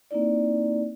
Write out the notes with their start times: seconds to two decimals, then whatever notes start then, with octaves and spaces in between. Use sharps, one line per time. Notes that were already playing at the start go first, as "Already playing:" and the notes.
0.11 A#3 C4 D#4 E4 D5